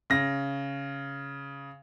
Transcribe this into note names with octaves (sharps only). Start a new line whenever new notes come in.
C#3 A#6